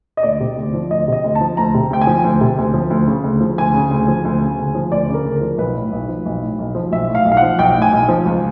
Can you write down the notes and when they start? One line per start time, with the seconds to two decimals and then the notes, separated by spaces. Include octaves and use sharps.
0.17 D#5
0.23 D2 D5
0.40 C3
0.57 D2
0.74 F3
0.90 D2 D#5
1.08 C3 D#5
1.24 D2
1.35 A5
1.41 F3
1.57 D2 A#5
1.75 C3
1.90 D2 G5
2.01 G#5
2.07 F3
2.24 D2
2.41 C3
2.58 D2
2.74 F3
2.90 D2
3.07 C#3
3.24 D2
3.41 F3
3.58 D2 G#5
3.74 C#3
3.91 D2
4.08 F3
4.25 D2
4.41 C#3
4.59 D2
4.75 F3
4.92 D2 D5
5.08 C#3
5.14 A#4
5.24 D2
5.36 A#4
5.41 F3
5.58 B1 B4
5.75 A2
5.92 B1
6.08 F3
6.26 B1
6.42 A2
6.59 B1
6.75 F3
6.92 B1 E5
7.09 A2
7.15 F5
7.25 B1
7.32 F5
7.37 F#5
7.42 F3
7.59 B1 G5
7.76 A2
7.82 G#5
7.93 B1
8.08 F3
8.26 C#2